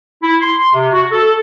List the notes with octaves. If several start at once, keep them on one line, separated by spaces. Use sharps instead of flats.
E4
C6
C3
F#4
A4